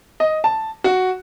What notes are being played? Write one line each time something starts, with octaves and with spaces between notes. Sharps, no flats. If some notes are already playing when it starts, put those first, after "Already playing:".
D#5
A5
F#4